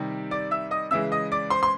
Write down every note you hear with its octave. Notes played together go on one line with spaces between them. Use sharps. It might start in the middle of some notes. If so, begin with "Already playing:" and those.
Already playing: C3 D#3 G3
D5 D6
E5 E6
D#5 D#6
C#3 E3 G#3 E5 E6
D#5 D#6
D5 D6
C5 C6
C6